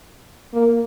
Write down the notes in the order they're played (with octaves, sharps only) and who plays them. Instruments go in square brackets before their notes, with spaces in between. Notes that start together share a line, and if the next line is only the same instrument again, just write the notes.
[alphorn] A#3